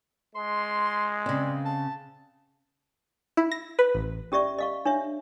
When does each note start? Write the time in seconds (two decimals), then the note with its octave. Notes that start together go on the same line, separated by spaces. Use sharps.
0.35 G#3 C6
1.26 C#3 C4 D5
1.65 A5
3.37 E4
3.52 A#6
3.79 B4
3.95 A1
4.32 C#4 G4 D5 E5 C#6
4.58 D#5 F5 C#6
4.85 D4 C#5 E5